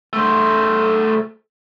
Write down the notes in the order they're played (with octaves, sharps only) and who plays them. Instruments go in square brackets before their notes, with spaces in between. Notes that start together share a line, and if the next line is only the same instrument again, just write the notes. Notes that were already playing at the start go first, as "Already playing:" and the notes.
[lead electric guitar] A3 C5